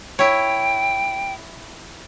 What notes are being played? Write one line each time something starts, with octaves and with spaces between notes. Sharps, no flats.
E4 C#5 G5